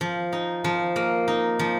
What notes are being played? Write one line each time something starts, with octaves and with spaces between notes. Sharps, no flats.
F3
D#4
F3
A#3
D#4
F3